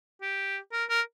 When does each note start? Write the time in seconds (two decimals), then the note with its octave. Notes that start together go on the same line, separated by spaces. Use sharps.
0.22 G4
0.73 A#4
0.90 A#4